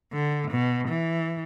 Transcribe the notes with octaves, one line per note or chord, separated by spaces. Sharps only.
D3
B2
E3